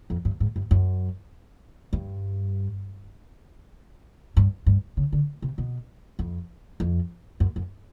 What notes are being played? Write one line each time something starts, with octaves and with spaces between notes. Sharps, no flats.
F2
G2
G#2
G2
F#2
G2
G2
G2
C#3
D3
C3
B2
F2
F2
F#2
F#2